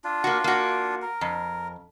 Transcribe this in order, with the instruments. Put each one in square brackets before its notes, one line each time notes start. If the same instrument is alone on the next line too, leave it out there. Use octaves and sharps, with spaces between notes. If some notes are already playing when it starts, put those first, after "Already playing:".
[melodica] D4 F4
[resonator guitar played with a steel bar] A#3 F#4
A#3 F#4
[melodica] A#4
[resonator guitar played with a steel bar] F2